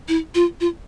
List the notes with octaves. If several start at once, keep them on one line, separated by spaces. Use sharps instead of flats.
E4
F4
F4